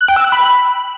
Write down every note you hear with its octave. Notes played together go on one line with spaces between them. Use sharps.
F#6
G5
E6
F#6
B5